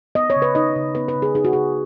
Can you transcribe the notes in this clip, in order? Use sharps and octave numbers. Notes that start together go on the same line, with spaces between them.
B3 D#5
C#5
C#3
B4
D#4 D#5
C#3
B3 B4
B4
C#3
G#4
D#4 G#4
F#4
C#3 G#4